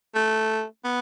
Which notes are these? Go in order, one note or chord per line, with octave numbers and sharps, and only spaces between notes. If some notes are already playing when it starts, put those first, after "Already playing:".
A3
B3